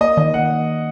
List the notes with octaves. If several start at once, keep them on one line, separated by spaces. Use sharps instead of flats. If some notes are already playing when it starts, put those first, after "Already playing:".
A#3 D#5
D#3 D#5
A#3 F#5